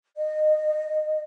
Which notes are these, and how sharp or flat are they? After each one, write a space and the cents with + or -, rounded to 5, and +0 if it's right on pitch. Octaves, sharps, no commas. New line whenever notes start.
D#5 -20